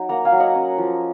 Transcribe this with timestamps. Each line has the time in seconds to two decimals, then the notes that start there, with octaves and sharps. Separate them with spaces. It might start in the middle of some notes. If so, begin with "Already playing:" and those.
Already playing: F#3 D#4
0.09 A#3 F#5 A#5
0.25 F5 G#5
0.32 F#3
0.40 D#5 F#5
0.55 C#4
0.78 F3